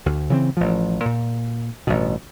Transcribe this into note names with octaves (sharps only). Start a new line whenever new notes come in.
D2
C#3 E3 G#3 C4
A1 F3
A#2
A1 G2 B2